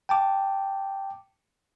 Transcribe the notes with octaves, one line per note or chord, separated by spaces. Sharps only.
G5 A5 D6